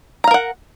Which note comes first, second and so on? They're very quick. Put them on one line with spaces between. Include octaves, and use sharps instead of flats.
A#5 F5 A#4 F#5